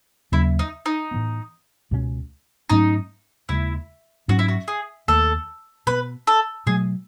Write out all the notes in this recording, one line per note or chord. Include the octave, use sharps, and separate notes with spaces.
D#2 C#3 F#3 C#4 E4
D#4
D#4
A2 E3 B3
C#2 B2 F#3 C#4
G#2 F#3 A3 C#4 D#4
D#2 C#3 G#3 E4
G#2 F#3 C#4 F#4
E4
F#4
G#4
D#2 D#3 A3 A4
B2 G#3 B3 B4
A4
B2 F#3 A3 G#4